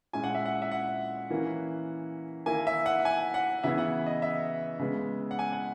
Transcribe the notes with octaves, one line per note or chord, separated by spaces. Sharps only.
A#2 G#3 C#4 E4 G#5
F#5
E5
F#5
E5
F#5
E3 A#3 C#4 E4
D#3 A#3 E4 G#5
E5
F#5
G#5
F#5
C#3 E3 B3 E4 E5
F#5
D#5
E5
C#3 G#3 B3
F#5
G#5
F#5